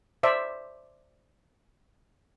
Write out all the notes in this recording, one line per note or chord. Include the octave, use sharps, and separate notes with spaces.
C5 D5 E5